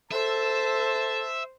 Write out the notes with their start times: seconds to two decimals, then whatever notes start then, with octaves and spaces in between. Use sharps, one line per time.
0.11 A4 C5 E5 A5